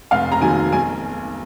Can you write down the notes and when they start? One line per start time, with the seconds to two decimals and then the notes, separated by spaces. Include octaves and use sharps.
0.11 F1 F5
0.32 A#5
0.41 D#2 D#3 F#3 G#5
0.72 B1 G#5